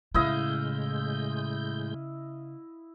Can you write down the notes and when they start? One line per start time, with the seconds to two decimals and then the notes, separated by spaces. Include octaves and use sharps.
0.15 A2 C#3 G#3 E4 D#5 F5 G6